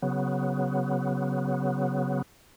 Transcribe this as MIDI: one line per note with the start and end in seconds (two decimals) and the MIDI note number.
0.02 2.22 49
0.02 2.22 54
0.02 2.22 59